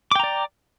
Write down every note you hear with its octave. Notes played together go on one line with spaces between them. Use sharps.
D5 G5 A#5 D6